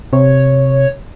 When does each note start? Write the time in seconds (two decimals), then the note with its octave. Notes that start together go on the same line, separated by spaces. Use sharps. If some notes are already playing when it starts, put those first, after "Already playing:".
0.13 C3 C#5